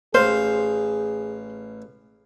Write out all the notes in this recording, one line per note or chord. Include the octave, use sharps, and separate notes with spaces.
A1 G#4 C5 F5